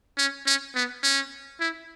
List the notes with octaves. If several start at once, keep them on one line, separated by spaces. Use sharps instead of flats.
C#4
C#4
B3
C#4
E4